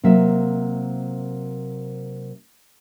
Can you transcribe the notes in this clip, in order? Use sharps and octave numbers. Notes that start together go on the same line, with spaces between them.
C3 F#3 A#3 E5